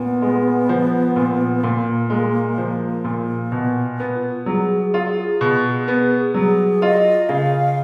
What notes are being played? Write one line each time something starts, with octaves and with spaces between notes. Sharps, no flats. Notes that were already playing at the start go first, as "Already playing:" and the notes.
Already playing: A#2 B3
G#3
F3
A#2
A#2 A#3
G#3
F3
A#2
B2 B3
B3
F4
F#3 G#4
F4
B2
B3
F#3 G#4
F4 D#5
C#3 F5